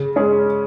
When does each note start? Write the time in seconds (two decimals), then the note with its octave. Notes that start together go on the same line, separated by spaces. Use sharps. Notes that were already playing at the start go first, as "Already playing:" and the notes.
Already playing: C#3
0.16 G#3 C#4 G#4